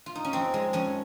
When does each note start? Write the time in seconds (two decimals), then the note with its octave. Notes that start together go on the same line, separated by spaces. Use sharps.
0.06 F4
0.15 D#4
0.25 C#4
0.33 F2 C4
0.54 G#3
0.73 F2 C#4